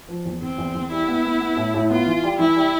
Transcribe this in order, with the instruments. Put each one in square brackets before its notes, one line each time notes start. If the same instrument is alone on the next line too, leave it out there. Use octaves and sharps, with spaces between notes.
[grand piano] F3
E2
[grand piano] E2 [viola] C4
[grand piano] E2
E2
[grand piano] G3 [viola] E4
[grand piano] B3
B3
B3
A2
A2
[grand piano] B3 [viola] F4
[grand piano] E3
G3
[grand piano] E3 [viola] E4
[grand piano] G3